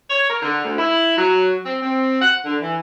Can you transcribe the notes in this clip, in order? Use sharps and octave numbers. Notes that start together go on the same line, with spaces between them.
C#5
A#4
D3
D2
E4
F#3
C4
C4
F#5
D3
E3